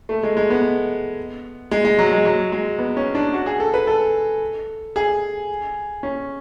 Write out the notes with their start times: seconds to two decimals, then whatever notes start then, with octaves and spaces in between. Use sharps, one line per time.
0.09 A3
0.23 G#3
0.37 G#3
0.50 B3
1.71 G#3
1.85 G#3
1.99 F#3
2.12 G#3
2.25 F#3
2.52 G#3
2.79 B3
2.97 C#4
3.15 D4
3.33 F#4
3.46 G#4
3.60 A4
3.74 B4
3.87 A4
4.96 G#4
6.03 C#4